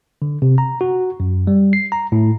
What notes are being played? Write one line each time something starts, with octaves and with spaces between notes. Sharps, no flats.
D3
C3
A#5
F#4
F#2
G3
C7
A#5
A2